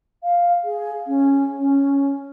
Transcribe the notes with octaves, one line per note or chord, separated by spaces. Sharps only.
F5
G#4
C#4
C#4